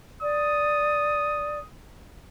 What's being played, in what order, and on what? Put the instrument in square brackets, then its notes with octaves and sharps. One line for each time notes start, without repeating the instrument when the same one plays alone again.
[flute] D5 [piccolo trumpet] D#6